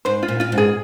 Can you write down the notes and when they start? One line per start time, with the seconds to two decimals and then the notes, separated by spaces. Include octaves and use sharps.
0.05 G#2 C5
0.23 F4
0.28 A#2
0.40 A#2 F4
0.52 G#2
0.58 G#4